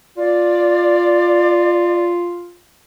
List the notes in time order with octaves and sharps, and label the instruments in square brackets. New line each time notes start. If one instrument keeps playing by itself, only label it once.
[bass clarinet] F4 [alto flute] D5